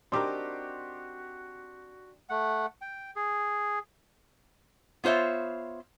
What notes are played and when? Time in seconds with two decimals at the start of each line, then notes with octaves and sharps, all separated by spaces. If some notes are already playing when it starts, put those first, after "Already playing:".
0.12 C4 D4 D#4 F#4 G4 A#4 C6 D6
2.29 A3 F#5
2.81 G5
3.16 G#4
5.04 B3 F4 C5 C#5 E5